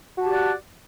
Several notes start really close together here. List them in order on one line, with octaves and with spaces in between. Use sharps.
F#4 A5 G4 D5 F#5